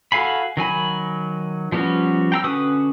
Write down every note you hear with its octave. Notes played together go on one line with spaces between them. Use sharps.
F#4 A4 F5 G#5 B5
D#3 F#3 G#5 B5
F3 G3 B3 C#4 F#4
G5 A#5 E6
D3 C#4 F#4 B4 D#6